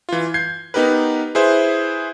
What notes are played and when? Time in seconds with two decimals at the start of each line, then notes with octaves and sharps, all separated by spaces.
0.09 E3 F4
0.34 G6 G#6 C7
0.74 B3 D#4 G4 A#4 B4
1.35 E4 G#4 B4 C5 E5